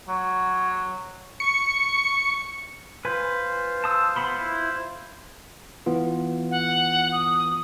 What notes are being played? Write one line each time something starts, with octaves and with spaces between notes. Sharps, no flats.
F#3
C#6 C#7
F4 B4 C5 G#5
A5 D#6 E6
B3 B5 C6
E4
E3 B3 F4
F#5
D#6